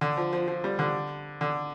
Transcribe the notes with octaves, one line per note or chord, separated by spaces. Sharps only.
D3
F3
F3
F3
G3
D3
D3